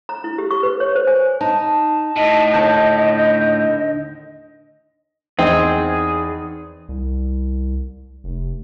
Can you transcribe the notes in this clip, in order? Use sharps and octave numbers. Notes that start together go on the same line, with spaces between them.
A#5
E4
G4
C#6
B4
C#5
C5
G#5
D#4 A5
A2 D#5
D#2 D3 A5 G6
E2 C4 D#4 G#4
C2
F1